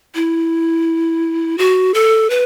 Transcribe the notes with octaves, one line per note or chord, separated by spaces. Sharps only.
E4
F#4
A4
B4